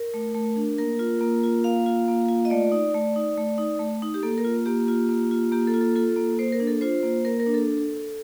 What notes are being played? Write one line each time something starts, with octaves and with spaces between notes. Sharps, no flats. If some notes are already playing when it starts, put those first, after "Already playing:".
Already playing: A#4
A3
A3
D4
A#3 A#4
F4
A#3
F4
A#3 F5
F4
A#3
F4
D#5
A3 D5
D#4
A3
D#4
A3
D#4
A3
D#4
G4
A#3 A4
A#4
F4
A#3 G4
F4
A#3
F4
A#3 G4
A4
F4
A4
F4 A4
A#3
A#3 C5
A#4
D4
A4
F4 C5
A#3
A#3 A#4
A#4
D4
A4